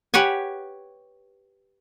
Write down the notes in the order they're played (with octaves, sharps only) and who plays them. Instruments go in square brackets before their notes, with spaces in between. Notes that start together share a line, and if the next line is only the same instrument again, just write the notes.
[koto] G4 B4 C#5 F#5 G#5